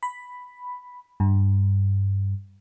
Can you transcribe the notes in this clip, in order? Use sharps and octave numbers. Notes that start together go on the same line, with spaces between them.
B5
G2